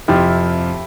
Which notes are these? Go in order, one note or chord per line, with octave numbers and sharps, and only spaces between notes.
F2 C3 F3 E4 G4